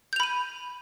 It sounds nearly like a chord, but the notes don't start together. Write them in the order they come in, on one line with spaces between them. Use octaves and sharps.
G6 F7 B5 D#7